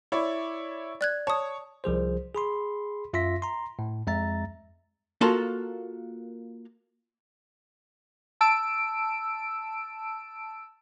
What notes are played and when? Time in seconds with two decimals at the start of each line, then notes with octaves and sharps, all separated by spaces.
0.12 E4 C#5 D5
1.01 D5 F#6 G#6
1.27 C#5 A5 D#6
1.84 C2 F3 G#4 C5
2.35 G#4 B5 C6
3.13 F#2 F4 E5 C6 A#6 B6
3.42 A#5 C6
3.79 A2
4.07 F2 G#3 E5 A#5 A6
5.21 A#3 F4 F#4 A4 A#4 A5
8.41 A5 E6 D7